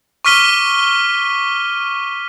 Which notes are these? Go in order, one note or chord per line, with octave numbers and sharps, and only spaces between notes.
C#6 D6 F6 B6 D#7 G7